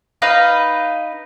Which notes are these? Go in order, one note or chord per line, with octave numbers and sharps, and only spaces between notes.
D#4 B4 F5